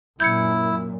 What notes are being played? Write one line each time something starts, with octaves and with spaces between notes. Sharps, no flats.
F#2 A#2 E4 G6 G#6 C#7